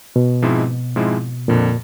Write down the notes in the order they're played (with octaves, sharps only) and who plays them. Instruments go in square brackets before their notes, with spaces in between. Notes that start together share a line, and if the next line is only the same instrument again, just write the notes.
[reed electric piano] B2
[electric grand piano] G#2 F3 G#3 C4 E4
G#2 F3 G#3 C4 E4
[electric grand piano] F2 D3 F3 [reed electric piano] A#2